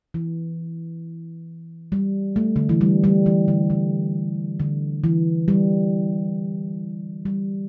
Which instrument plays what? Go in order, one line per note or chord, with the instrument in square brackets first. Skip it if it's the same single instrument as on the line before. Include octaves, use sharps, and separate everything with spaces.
[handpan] E3
G3
A3
D3
E3
G3
G3
E3
D3
D3
D3
E3
G3
G3